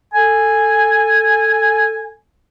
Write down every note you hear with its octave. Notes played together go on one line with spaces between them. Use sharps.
A4 G#5